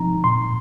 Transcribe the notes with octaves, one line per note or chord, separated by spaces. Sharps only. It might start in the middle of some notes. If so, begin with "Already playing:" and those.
Already playing: C3 F3 C4 D#4 A#5
A#2 C6